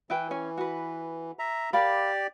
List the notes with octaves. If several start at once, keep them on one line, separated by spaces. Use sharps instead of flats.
E3 E4 B4 G5
C#4 C#5 G#5
F#4 B4
E5 A#5
G4 A#4 D5 F5 B5